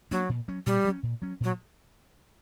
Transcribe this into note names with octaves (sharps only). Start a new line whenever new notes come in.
F#3 A#3 D4
A#2
F#3 C#4
A#2 G3
F#3 C#4
A#2
F#3 C#4
A#2 F#3